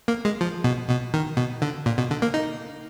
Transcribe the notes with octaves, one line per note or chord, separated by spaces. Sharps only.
A#3
G#3
F3
B2
B2
D#3
B2
D3
A#2
B2
D3
A#3
D#4